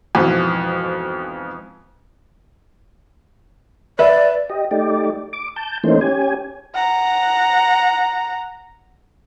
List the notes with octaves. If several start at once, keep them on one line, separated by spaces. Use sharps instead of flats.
F2 G#2 B2 E3
B4 D5 E5
G4 D#5
A3 D#4 G4 D5
D6
A5 G6
E3 A3 A#3 C#4 D#4 C5
C#4 G4 G#5
F#5 A#5